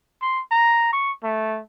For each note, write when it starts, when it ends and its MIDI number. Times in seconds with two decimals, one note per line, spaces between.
0.22 0.41 84
0.51 0.91 82
0.93 1.12 85
1.23 1.60 57